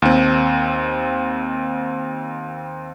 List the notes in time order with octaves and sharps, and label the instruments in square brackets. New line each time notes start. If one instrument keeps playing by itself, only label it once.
[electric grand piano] D#2 C4